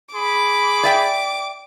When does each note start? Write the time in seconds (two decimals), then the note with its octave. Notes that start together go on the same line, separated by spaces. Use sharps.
0.14 G#4 B5 D6
0.83 D5 E5 G5